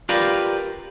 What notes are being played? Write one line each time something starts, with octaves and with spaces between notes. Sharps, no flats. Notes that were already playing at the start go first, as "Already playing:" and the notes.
F4 G4 A#4 B4 D5 F5